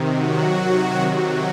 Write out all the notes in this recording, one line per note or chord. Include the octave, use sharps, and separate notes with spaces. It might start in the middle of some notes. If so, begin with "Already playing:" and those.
Already playing: C3 D#3
F#3 F#4
C3 D#3
F#3 F#4